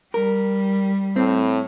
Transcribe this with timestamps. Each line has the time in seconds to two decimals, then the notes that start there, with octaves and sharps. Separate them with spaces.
0.14 G3 A#4
1.16 A2 C4